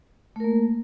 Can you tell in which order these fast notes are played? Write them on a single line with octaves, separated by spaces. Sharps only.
A3 A#4 A#3